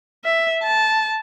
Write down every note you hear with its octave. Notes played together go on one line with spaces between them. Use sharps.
E5
A5